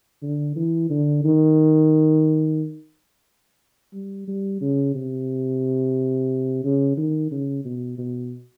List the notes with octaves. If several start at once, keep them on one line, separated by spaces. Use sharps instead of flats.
D3
E3
D3
D#3
G3
G3
C#3
C3
C#3
D#3
C#3
B2
B2